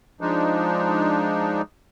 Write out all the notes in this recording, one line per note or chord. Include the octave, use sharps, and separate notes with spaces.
F3 G#3 D4 D#4